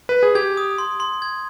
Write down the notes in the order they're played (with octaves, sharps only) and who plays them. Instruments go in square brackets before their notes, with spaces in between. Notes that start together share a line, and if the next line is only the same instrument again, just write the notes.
[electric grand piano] B4
G#4
[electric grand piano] G4 [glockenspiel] G#6
[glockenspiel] D#6
C6
C6
G#6